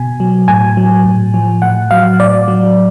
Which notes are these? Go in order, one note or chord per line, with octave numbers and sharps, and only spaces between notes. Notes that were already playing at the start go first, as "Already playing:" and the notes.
Already playing: B2 G#5
F#3
A2 G#5
F#3
A2
F3
A2 F#5
F#3 F5
A2 D5
F#3